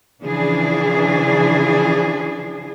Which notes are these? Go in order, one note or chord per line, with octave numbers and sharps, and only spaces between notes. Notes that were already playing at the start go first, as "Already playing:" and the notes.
C#3 E3 F3 D4 G#4